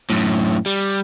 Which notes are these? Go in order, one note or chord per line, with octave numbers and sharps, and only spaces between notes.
F#2 A2
G3